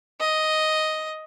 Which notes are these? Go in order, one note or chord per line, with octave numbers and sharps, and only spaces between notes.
D#5